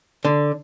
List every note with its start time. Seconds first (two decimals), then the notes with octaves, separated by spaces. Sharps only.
0.25 D3